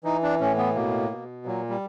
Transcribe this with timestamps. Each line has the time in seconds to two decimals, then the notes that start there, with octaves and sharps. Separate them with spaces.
0.04 E3 D#4
0.23 D4
0.40 A2 C#4
0.58 B3
0.75 B2 A#3
1.10 B2
1.46 A#2 F#3
1.69 G3